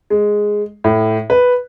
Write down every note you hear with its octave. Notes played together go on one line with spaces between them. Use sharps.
G#3
A2
B4